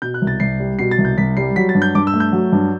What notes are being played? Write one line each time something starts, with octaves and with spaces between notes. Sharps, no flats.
B2 G6
F#6
C2
A6
C2 C7
G3
B2 C7
A6
C2
G6
C2 B6
G3 C7
F#3 B6
A6
G2
G6
G2 D6
E6
A3
G6
F#3
G2